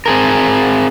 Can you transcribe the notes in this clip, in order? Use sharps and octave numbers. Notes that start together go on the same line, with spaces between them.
C4 G#4 A#4